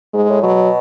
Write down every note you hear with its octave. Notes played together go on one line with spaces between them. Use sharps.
G#2 G#3
A2
B2 F#3